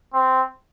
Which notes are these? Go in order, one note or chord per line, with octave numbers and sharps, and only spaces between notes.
C4